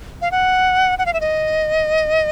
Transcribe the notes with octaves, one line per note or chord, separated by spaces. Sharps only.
F5
F#5
F#5
F5
E5
D#5